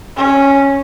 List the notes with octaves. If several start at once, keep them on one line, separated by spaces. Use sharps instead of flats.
C#4